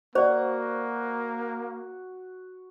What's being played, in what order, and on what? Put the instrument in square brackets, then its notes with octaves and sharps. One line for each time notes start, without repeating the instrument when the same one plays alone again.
[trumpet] A#3 [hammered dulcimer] F#4 [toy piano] C5 D5